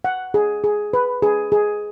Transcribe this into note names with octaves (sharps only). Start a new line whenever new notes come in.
F#5
G#4
G#4
B4
G#4
G#4